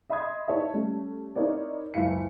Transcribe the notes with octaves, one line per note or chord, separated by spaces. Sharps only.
D#5 E5 B5 C6 D#6 G#6
D#4 E4 C#5 D#5 E5 A5
G3 A3 C#4
C4 D#4 E4 A#4 C#5 D5
F#1 C#2 E4 F4 F5 C#7